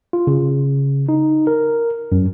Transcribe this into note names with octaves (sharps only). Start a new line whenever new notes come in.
F4
C#3
D#4
A#4
F#2